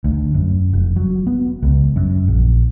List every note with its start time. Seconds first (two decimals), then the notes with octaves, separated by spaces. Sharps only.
0.04 D2
0.34 F#2
0.73 F1
0.96 F#3
1.27 B3
1.63 C#2
1.96 F#2
2.28 A#1